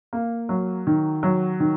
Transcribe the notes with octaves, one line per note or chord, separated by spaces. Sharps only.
A#3
F#3
D#3
F#3
D#3